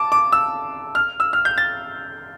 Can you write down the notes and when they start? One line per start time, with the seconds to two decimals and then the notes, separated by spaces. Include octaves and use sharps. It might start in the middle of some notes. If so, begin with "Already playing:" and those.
Already playing: A5 D6
0.12 D6
0.32 E6
0.95 F6
1.20 E6
1.33 F6
1.45 G6
1.58 A6